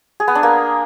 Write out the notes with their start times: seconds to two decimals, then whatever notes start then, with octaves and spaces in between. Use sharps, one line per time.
0.20 G#4
0.28 B3
0.35 D4
0.43 A#3